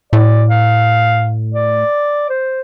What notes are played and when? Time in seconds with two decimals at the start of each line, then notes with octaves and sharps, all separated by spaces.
0.13 A2 D5
0.50 F5
1.54 D5
2.30 C5